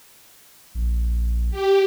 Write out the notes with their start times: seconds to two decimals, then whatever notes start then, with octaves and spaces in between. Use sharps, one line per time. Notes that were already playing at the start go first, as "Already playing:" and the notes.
0.75 A#1
1.51 G4